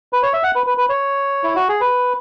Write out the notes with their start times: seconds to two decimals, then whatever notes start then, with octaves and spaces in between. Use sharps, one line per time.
0.13 B4
0.23 C#5
0.33 E5
0.43 F#5
0.55 B4
0.67 B4
0.78 B4
0.89 C#5
1.44 E4
1.56 F#4
1.69 G#4
1.81 B4